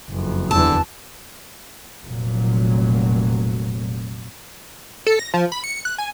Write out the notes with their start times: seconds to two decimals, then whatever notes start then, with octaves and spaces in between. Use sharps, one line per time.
0.10 F#1 F2
0.51 E2 D3 E3 A5 E6
2.06 F1 A#2 F#3
5.06 A4
5.19 A#6
5.34 F3
5.52 B5
5.64 C#7
5.85 F#6
5.98 G#5